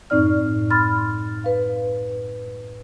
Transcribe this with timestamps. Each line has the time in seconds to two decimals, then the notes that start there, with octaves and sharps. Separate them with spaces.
0.10 F#2 A2 C4 D#4 D5 F6
0.70 B5 C6 F6 A6
1.44 B4 F5